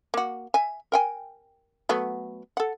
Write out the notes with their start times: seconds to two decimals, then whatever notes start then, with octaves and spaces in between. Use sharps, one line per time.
0.14 A#3 F#4
0.54 E5 G#5
0.92 A#4 G5 G#5
1.89 F#3 A3 B3
2.57 A4 F#5